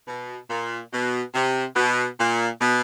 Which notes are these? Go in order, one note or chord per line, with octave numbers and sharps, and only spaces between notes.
B2
A#2
B2
C3
B2
A#2
B2